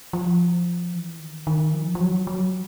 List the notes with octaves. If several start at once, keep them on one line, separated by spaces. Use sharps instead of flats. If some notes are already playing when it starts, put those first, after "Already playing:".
F3
E3
D#3
D#3
F3
F3
F#3
F#3